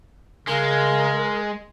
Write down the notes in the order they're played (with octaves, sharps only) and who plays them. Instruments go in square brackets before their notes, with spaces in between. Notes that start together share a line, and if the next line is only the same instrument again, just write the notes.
[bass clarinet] C#3 [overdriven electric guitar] G#3 [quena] A#4